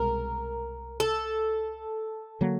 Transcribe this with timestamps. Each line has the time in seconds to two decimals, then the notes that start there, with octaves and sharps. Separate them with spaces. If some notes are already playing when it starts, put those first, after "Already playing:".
Already playing: C2 B2 G#3 A#4
1.00 A4
2.41 D3 F#3 A#3